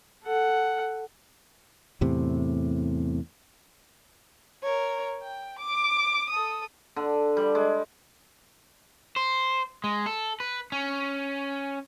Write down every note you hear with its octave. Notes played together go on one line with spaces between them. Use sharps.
A4 F#5
E2 A2 C3
A#4 C#5
G5
D6
A4 D#6
D3
G3
G#3
C5
G#3
A4
B4
C#4